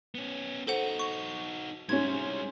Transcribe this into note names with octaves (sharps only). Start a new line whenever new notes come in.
B3 C#4
D#4 F#4 A4 C5 F#5
C#6
G#2 G3 C#4 E4 G#6